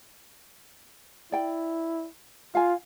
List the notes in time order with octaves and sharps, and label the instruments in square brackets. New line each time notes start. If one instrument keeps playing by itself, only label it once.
[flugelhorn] E4 [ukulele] D5 G5
[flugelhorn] F4 [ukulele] F5 G#5